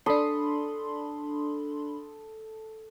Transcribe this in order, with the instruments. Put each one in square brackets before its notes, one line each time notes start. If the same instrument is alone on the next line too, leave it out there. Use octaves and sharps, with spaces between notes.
[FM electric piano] D4 B5 C6 [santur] A4 D#6